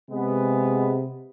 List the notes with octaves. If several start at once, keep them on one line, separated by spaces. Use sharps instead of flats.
C3 G#3 B3